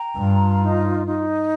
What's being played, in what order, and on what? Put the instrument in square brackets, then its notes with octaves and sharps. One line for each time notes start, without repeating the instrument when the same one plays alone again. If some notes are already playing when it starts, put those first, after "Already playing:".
Already playing: [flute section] G5 A#5
[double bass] G2 [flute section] F4
[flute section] D#4
D#4